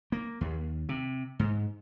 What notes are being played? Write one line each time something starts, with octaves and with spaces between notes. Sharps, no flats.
A#3
D#2
C3
G#2